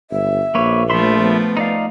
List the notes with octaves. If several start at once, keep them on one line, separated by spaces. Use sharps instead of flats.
G1 E5
A#1 A#3 B4 C#5
F3 A3 E5 B5 C6
B3
D#4 D5 F5